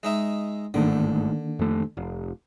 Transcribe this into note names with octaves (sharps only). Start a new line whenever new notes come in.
G#3 D#4 E5
G1 G#2 D3 D#3 A3 A#3 D4
F2 A3
F1